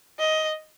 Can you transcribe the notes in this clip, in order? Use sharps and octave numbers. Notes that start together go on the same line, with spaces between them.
D#5